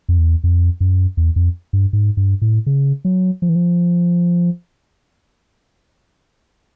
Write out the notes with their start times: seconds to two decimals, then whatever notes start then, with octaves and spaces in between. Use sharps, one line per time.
0.09 F2
0.18 E2
0.44 F2
0.80 F#2
1.17 E2
1.36 F2
1.73 G2
1.93 G#2
2.17 G2
2.42 A2
2.66 C#3
3.05 F#3
3.42 F3
3.49 E3
3.55 F3